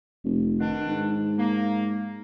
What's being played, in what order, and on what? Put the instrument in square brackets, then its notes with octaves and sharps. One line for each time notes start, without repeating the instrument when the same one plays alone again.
[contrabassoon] F1
[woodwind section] B2 D#3 D4
[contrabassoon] G#2
[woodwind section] A#3